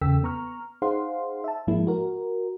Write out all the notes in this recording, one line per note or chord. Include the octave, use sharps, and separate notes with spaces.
E2 C#3 A4 G5 E6 B6
B3 A#5 C#6 F6
D#4 G#4 C5 F5 F#5 C6
E5 A5
G#2 F3 G#3 A#3 E4
F#4 A#4